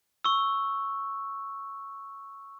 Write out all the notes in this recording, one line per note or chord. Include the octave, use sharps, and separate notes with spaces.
C#6 E6